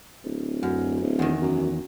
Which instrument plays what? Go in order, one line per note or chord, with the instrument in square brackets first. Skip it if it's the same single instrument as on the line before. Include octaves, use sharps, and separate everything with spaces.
[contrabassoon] D1
[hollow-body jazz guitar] F#2
[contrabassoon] D1
[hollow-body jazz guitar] E2 D#3
[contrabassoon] F#2